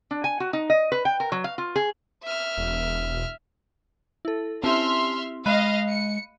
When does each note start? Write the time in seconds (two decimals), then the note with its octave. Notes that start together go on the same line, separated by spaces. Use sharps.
0.11 D4
0.24 G#5
0.40 F#4
0.53 D#4
0.70 D#5
0.92 B4
1.05 G5
1.20 A#4
1.32 F#3
1.44 F5
1.58 F4
1.76 G#4
2.24 E5 F6
2.57 E1
4.25 E4 A4
4.64 C4 C#4 E4 G4 E5 A5 C6 F6
5.46 G#3 D#5 F5 B5 F#6 D#7
5.90 C#7